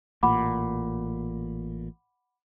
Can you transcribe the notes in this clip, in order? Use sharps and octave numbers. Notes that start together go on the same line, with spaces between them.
A1 A#2 F#5 B5 D6